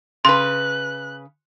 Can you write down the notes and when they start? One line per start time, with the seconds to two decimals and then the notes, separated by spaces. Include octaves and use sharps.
0.25 C#3 B4 C6 F#6